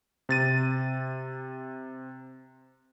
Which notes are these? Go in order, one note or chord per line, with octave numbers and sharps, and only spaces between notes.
C3 A6 D#7